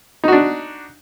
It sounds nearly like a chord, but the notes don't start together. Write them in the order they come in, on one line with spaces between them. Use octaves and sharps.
D#4 F#4 D4